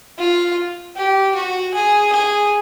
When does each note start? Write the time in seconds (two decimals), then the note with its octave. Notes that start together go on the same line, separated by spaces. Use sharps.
0.19 F4
0.96 G4
1.35 F#4
1.74 G#4
2.12 G#4